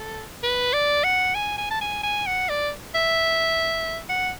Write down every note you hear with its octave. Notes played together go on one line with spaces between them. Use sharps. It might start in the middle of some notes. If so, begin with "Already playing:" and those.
Already playing: A4
B4
D5
F#5
G#5
G#5
A5
G#5
G#5
F#5
D5
E5
F#5